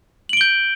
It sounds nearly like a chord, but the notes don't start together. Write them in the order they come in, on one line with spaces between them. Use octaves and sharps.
F#7 D7 G7 G6